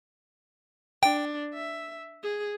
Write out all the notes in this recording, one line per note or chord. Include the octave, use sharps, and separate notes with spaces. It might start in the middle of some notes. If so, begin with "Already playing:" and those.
D4 G5
E5
G#4